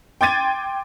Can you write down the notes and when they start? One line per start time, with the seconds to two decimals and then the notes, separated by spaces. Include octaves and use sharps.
0.21 G5 C6 D6 G#6 A6 D#7